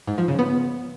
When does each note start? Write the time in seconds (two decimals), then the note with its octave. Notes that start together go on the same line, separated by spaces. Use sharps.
0.07 G#2
0.18 F3
0.28 C#3
0.39 B3